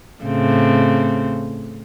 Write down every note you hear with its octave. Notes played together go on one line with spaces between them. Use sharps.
A2 C#3 C4